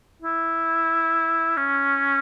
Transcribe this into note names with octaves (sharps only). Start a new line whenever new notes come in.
E4
C#4